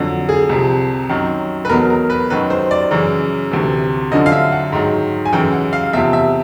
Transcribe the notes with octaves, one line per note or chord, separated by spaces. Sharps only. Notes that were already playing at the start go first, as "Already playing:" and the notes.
Already playing: F2 D3 F#3
G#4
C2 C3 F3
F#2 D#3 F#3
B4
E2 B2 F#3 A#4
A#4
B4
F#2 D#3 F#3 B4
C5
D5
F#2 C#3 E3
D2 C3 E3
F#2 D3 F3 D#5
F5
E5
F#5
G#2 D#3 F#3
G#5
F#2 C#3 E3 G5
F#5
F5
E2 C3 F3 E5
E5